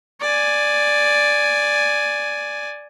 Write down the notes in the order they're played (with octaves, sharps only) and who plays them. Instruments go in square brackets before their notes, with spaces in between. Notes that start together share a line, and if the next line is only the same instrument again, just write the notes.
[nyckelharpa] D5 G#5